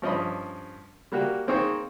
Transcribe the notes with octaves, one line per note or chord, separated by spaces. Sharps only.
G2 F3 C#4 D#5 B5
G3 A#3 F#4 G4
A#3 C4 D#4 G#4 C#5 G5